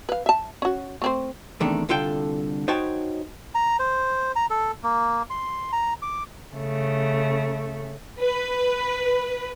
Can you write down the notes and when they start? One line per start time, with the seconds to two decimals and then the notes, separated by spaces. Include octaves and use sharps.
0.09 B4 F5
0.26 E5 A5
0.62 C#4 F#4
1.02 A3 C4 C5
1.60 E2 C3 D#3 A3 D4
1.89 C2 D3 F4 A4 G5
2.68 D#4 F#4 C5 C#5 G5 A5
3.55 A#5
3.79 C5
4.36 A#5
4.50 A4
4.83 A#3
5.30 C6
5.73 A#5
6.02 D6
6.54 C#3 A3
8.20 B4